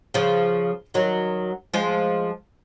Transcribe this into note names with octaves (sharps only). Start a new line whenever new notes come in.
C#3 F3
D#3 F#3
F3 G#3